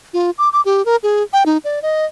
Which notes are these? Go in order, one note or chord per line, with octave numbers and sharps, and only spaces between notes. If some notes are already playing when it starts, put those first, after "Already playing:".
F4
D6
D6
G4
A#4
G#4
G5
D#4
D5
D#5